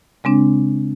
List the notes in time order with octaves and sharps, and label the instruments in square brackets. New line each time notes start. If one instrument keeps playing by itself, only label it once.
[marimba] C#3 G#3 C4 D4